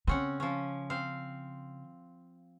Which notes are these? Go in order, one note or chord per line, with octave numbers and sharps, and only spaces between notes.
C#3 C4 C#4 F#5
F3 C#4
C4 F5